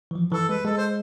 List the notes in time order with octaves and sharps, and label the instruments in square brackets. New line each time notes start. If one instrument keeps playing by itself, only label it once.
[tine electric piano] E3
F3
[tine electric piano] E3 [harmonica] A4
[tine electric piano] G#3 [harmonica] B4
[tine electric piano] G#3 [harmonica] A4
[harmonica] C5